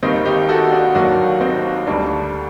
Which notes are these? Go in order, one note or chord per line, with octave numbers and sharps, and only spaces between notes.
D#2 D#3 G3 C4 D#4
D#4 G4
F#4 A4
D4 F#4
D#2 D#3 F#3 D4 F#4
C4 D#4
D2 D3 G3 D4